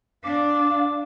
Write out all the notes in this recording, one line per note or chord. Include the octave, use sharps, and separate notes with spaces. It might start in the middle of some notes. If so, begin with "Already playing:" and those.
D4 F5 D6